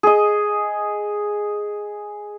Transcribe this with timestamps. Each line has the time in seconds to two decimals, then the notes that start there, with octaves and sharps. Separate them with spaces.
0.03 G#4 D#5